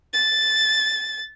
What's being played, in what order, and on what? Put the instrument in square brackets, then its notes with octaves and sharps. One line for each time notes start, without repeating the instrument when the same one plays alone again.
[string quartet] A6